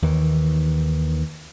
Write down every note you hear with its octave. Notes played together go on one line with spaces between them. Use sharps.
D#2 D#3 E3